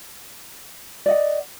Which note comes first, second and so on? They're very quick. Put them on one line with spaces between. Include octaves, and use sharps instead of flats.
D5 D#5 F#5